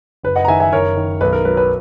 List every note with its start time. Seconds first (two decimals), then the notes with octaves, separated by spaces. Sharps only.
0.23 F#1 B4
0.36 D#5 F#5
0.45 A#5
0.48 D#3 E5 G#5
0.60 E5 G#5
0.72 F#1 A#4 C#5
0.97 D#3
1.21 B1 B4
1.33 A#4
1.45 F#3 B4
1.57 B4